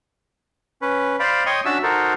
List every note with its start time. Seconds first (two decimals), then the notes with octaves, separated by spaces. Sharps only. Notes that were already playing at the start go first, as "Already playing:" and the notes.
0.82 C#4 B4
1.20 C5 D5 F5 B5
1.46 C#5 D#5 G5 C6 C#6 D#6
1.65 C#4 D4 F#4 E5 A5 E6
1.83 D#4 F#4 A4 A#4 C5